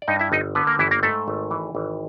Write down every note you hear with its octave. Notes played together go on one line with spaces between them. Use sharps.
D5
G2 D#4 D#5
E4 E5
G1 D#4 D#5
D3 B3 B4
A#3 A#4
G1 E3 E4
A#3 A#4
G#2 A3 A4
G#1
E3
G#1